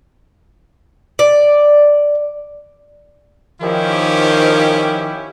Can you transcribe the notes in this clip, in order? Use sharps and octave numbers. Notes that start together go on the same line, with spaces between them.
D5
D#3 F3 C#4 E4 G4